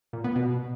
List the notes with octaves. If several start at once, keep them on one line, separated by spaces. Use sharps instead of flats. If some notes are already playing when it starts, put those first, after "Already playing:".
A#2
B3
B2